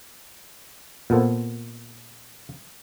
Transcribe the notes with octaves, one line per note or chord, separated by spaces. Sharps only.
A#2 B3 A4 C5